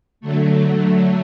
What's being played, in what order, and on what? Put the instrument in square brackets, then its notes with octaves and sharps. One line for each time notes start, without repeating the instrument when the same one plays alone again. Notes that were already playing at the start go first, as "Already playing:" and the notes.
[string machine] D3 F#3 A3